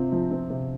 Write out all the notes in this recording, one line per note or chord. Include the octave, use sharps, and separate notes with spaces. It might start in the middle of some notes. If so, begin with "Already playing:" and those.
Already playing: C3 C4 F4
F3
C4
C3